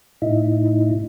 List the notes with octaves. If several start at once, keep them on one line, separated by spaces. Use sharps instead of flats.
A2 D#4 E4